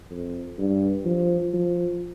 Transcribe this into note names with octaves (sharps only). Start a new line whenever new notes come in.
F2
G2
F3
F3